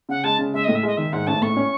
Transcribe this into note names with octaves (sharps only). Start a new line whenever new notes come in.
C#3 F#5
G#3 A5
C#3
G#3 E5
A2 D#5
E5
G#3 D#5
D#3 E5
G#2 F#5
A1 A5
A2 C#6
C#4